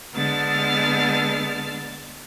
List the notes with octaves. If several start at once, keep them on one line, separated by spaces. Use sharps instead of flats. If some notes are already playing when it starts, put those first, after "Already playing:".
D3 G#3 B3 A5 F6 A6